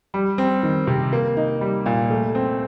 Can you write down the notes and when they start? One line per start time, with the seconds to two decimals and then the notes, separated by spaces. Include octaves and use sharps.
0.14 G3
0.38 C4
0.63 D#3
0.87 C3
1.13 A#3
1.37 D#4
1.61 G3
1.86 A#2
2.10 A3
2.35 C4